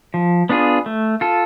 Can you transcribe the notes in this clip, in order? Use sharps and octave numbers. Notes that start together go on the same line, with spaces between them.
F3
B3 D4 F4 G#4
A3
F4 A4